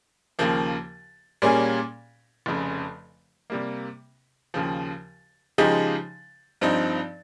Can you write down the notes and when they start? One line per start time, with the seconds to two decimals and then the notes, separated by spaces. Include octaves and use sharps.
0.39 D#2 C#3 F3 A#3
1.42 A#2 G3 A#3 C#4 G#4
2.46 F1 F2 C#3
3.50 C3 G3 A#3
4.54 D#2 C#3 F3
5.58 C#3 F3 G#3 D#4 G4
6.61 G2 F3 C4 D#4